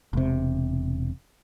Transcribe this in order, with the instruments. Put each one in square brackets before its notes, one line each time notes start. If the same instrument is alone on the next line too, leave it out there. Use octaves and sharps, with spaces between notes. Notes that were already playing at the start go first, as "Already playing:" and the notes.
[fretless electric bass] E1 C3